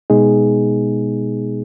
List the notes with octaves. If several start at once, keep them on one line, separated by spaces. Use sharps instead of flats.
B2 G#3 B3 D#4 G#4